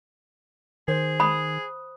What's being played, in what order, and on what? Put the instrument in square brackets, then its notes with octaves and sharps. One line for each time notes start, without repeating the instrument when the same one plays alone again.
[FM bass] D#3 [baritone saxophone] G#4 [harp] C5
[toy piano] B5 [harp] D#6 F#6